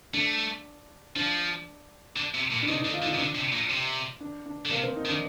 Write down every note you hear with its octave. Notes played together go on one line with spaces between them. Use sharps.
A3 D4
F3 D4
D3
C3
A#2
D4
C3 D#4
D3 D#4
F4
D3
D#4
C3
D3 D4
C3
A#2
C3
D4
D4
D3
C3 A#3
C4
D#4
D#3
D4